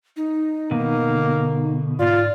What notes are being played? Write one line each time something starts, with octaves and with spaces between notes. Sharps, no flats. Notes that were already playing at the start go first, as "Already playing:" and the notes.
D#4
B2 D#3 A#3
D3
G#2 F4 D5